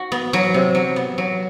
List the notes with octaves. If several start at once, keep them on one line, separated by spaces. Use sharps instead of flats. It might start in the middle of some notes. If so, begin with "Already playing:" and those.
Already playing: F#4
B3
F#3
C3
F#3
B3
F#3